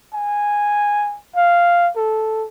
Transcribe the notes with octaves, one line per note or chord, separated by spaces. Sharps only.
G#5
F5
A4